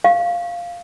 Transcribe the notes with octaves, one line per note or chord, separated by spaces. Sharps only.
F5